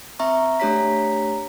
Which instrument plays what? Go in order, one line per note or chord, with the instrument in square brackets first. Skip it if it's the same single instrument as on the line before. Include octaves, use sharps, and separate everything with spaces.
[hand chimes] C4 E5 A#5 C#6
A3 D4 G4 C#5 A#5 B6